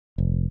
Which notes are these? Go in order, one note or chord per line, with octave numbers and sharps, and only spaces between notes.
F1